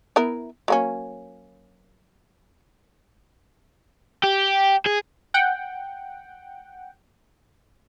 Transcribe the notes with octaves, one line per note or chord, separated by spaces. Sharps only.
B3 E4 A#4
F#3 A#3 C#4
G4
G#4
F#5 G5